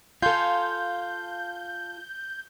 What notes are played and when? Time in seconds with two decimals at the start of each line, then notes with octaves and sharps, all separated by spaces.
0.22 F4 A4 F5 G#5 C6 G6